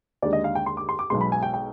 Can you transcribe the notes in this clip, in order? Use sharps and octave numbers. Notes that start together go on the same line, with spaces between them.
D#2 D3 G#3 D5
D#5
F5
G5
C6
D6
C6
D6
B1 B2 G#3 C6
B5
G#5
G5
G5